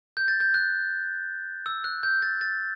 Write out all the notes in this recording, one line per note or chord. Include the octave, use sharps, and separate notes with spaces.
G6
A6
G6
F#6
E6
F#6
G6
A6
A6